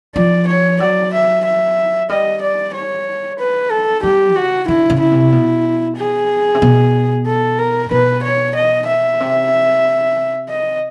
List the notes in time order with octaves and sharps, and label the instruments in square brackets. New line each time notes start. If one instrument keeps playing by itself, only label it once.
[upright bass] F3 [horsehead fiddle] D5
[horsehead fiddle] C#5
[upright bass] F#3 [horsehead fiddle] D5
[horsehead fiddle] E5
E5
[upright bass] G3 [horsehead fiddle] D#5
[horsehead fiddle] D5
C#5
B4
A4
[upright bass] G3 [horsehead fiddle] G4
[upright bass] C#3 [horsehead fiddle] F#4
[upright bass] D3 [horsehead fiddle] E4
[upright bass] C#3
[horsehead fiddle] E4
[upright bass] C3
B2
[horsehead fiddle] G#4
[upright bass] C3
B2
[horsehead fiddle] A4
A#4
[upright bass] B2 [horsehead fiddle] B4
[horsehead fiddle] C#5
D#5
E5
[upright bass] C3
[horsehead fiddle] D#5